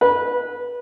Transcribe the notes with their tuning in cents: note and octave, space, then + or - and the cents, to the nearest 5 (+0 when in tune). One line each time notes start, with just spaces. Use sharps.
B4 -20